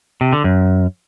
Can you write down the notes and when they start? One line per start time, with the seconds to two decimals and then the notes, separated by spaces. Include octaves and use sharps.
0.21 C3
0.33 D3
0.44 F#2